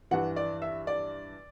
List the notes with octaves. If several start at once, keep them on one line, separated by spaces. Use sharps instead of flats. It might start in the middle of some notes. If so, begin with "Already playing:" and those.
G2 E3 F#5
D5
E5
D5